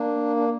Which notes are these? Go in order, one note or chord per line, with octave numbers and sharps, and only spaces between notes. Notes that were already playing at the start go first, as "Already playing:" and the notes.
Already playing: A#3 D4
D4